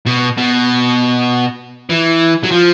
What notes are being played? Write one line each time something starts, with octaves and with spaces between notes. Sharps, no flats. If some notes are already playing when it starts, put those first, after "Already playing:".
B2
B2
E3
F#3
F3